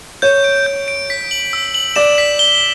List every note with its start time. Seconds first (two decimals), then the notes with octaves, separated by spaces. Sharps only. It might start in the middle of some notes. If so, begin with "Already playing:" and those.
0.22 C#5 G6
0.44 D7
0.66 G6
0.88 D7
1.10 B6
1.31 F#7
1.53 E6
1.75 F#7
1.96 D5 E7
2.18 B6
2.39 G7